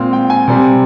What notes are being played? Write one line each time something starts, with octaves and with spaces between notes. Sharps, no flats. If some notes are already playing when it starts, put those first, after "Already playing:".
Already playing: A#2 G#3 C4 F5
G5
G#5
C3 G3 C4